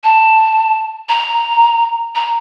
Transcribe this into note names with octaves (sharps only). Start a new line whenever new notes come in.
A5
A#5
A#5